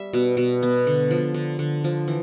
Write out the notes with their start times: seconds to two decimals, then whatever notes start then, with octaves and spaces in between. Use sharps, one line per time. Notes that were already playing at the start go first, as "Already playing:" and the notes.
Already playing: G3 E5
0.13 B2
0.37 B2
0.63 B3
0.87 D3
1.11 F3
1.34 D3
1.59 D3
1.84 F3
2.08 E3